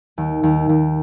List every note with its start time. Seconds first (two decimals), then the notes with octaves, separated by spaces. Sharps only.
0.18 D#2
0.43 D#2
0.69 D#2